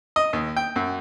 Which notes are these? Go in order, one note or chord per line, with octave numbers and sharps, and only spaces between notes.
D#5
D#2
G5
F#2